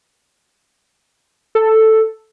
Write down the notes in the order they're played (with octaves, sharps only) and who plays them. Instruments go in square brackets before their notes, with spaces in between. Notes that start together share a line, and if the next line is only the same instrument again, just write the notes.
[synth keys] A4